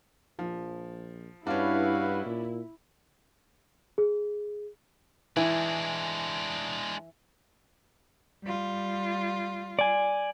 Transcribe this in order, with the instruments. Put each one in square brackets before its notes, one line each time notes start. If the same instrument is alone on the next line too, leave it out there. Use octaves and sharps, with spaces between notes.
[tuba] A#1 [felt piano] F3
[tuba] G2 [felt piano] C#4 D4 [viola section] E4 [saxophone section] F#4 B4 F5
[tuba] A#2
[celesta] G#4
[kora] E3 [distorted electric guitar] G#3 D4
[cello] G3 F4
[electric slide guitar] D5 G#5